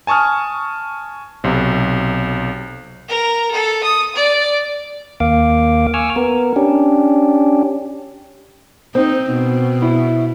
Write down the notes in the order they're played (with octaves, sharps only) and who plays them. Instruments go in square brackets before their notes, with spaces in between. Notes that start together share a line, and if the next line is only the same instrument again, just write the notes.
[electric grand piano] G#5 A5 C#6 D#6 F6
B1 C3
[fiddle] A#4
A4
D#6
D5
[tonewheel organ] D#2 A#3 F5 D6
G#5 C#6 D6 E6 F6
B3 A#4
C#4 D4 G4
[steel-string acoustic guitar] C4 [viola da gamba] D#4
[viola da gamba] B2
[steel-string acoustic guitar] E4